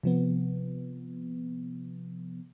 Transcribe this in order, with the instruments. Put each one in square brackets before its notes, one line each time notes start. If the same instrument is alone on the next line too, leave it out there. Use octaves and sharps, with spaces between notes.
[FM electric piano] C3 F3 B3